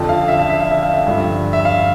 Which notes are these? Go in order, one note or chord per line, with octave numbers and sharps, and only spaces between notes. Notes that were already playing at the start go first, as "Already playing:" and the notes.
Already playing: F2 D3 F3 A5
F5
E5
F5
E5
F5
E5
F5
E5
G2 D3 F3
E5
F5